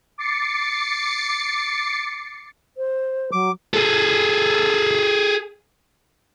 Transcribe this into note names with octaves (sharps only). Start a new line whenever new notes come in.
D6 A6 C7 C#7
C5
F#3 D6
G#4 A4